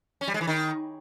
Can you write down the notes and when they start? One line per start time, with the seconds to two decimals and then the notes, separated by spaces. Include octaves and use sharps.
0.21 C#4
0.28 G3
0.34 G#3
0.41 E3
0.47 D#3